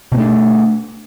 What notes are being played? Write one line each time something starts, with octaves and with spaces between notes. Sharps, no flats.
B2 A3 B3 D4